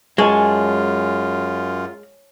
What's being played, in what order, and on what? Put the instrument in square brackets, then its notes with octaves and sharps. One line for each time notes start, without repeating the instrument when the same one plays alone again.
[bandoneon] F#2 F4 [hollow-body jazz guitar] G#3 [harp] C#5 G#5 A5